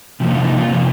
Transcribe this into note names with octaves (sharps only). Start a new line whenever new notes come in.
C3 F3 A#3
F4
D#4
F4
C3 F3 A#3